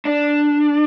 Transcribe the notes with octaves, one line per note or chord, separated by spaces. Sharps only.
D4